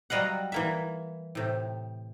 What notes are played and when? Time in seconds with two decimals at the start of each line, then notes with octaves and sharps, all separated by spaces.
0.10 F#3 G3 D#5 F5 F#5
0.52 E3 A#3 E5
1.35 A2 C3